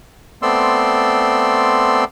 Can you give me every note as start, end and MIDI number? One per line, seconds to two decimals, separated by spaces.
0.42 2.04 57
0.42 2.04 59
0.42 2.04 60
0.42 2.04 74
0.42 2.04 84
0.42 2.04 88